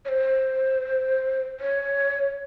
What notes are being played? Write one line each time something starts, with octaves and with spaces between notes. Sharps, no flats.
C#5
C5
C#5